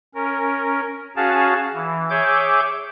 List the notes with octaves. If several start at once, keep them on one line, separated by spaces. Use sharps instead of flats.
C#4 A#4
C#4 F#4 G#4 F5 A5
E3
G#4 C#5 E5 D6 G6